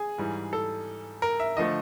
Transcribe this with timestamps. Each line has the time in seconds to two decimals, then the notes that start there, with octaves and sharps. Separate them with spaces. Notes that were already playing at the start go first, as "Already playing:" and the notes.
Already playing: G#4
0.18 G#2 E3 G3
0.53 A4
1.22 A#4
1.40 E5
1.57 D3 F3 A3 D#5